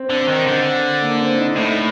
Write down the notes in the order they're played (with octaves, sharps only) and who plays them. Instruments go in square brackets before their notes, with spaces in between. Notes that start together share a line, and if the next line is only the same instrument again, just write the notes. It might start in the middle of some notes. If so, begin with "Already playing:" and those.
Already playing: [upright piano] C4
[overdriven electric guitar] D3
D#3
D3
[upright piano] A#3
C4
D#4
[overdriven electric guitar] A2 [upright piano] A3